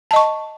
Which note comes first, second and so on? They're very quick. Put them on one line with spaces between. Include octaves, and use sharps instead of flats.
A5 D#5 C#6